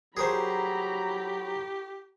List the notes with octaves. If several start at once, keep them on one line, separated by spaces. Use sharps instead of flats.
F#3 G4 G#4 A#4 C5 A#5 B5